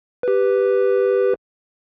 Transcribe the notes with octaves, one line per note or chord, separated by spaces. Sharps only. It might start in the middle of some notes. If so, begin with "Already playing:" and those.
G4 B4